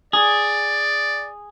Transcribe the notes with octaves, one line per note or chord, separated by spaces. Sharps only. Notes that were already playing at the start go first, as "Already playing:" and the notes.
G#4 D5